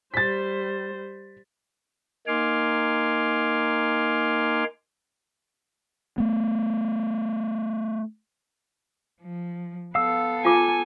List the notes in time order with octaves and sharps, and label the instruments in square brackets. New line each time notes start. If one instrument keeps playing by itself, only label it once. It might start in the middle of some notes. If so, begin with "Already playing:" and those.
[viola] G3 C5 [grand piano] A6 B6
[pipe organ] A#3 D#4 G#5 C6 D6 F6
[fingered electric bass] A3 B3
[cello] F3
[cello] B3 A4 [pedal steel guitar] F5 E6
[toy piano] F4 D6 [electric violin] G#5